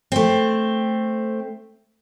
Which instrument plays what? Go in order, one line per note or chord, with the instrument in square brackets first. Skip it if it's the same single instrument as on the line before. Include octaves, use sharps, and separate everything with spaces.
[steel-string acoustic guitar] A3 C4